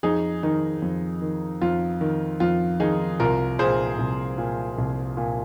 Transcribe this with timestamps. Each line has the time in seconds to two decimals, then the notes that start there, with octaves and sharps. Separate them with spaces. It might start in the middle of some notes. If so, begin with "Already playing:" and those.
0.03 F2 D#4 G#4
0.43 D#3 D#4
0.82 F2
1.22 D#3
1.61 F2 F4
2.01 D#3
2.40 F2 F4
2.80 D#3 D#4 G#4
3.20 C2 F4 A#4
3.59 A#2 G#4 C5
3.98 C2
4.38 A#2
4.78 C2
5.17 A#2